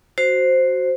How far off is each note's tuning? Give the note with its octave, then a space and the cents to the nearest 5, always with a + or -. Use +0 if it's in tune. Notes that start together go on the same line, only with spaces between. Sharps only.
F#4 +5 C5 +0